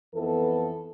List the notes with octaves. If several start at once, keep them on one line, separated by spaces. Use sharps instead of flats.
F2 E3 B3 A4